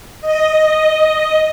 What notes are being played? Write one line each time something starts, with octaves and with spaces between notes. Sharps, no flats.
D#5